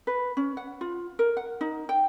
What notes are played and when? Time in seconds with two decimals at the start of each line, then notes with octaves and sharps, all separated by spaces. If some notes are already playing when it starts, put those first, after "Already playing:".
0.07 B4
0.37 C#4
0.57 F#5
0.81 F4
1.19 A#4
1.37 F#5
1.61 D#4
1.89 G5